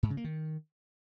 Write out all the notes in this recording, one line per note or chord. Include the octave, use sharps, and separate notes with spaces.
G#2
C#3
A#3
D#3